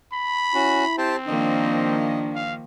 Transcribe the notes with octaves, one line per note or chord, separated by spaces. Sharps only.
B5
C#4 E4 F#4
C4 G4 C5 A5
D#3 F3 A#3 D4 D#5
F5